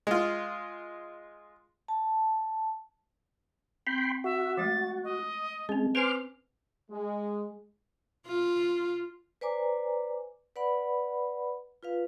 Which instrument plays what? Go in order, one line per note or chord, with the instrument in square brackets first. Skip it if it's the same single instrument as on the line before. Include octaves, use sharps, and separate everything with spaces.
[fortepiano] G#3 F4
[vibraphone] A5
[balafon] C4 [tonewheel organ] G5 B5 C6
[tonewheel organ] F#4 [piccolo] E5
[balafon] F3 G#3 A3 [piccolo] A6
[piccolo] D#5
[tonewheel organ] G#3 [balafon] C4 C#4
[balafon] B4 C5 G#5 [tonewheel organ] C6 D6 F6 [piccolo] F7
[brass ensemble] G#3
[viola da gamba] F4
[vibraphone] B4 C5 D5 G#5 A#5 D6
B4 D5 F#5 B5
F4 B4 F5